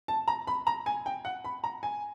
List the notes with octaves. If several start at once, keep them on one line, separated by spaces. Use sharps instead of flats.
A5
A#5
B5
A#5
G#5
G5
F#5
B5
A#5
G#5